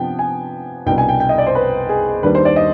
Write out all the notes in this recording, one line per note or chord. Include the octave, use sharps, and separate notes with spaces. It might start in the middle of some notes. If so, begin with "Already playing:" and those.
Already playing: C3 F3 B3 D4 G5
G#5
C2 B2 B3 D4 G5
G#5
G5
G5
D#5
D5
C5
B4
G#4
D#2 D#3 G3 D4 B4
C5
D5
D#5